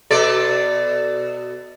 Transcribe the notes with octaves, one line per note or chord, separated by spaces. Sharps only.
B2 A4 D5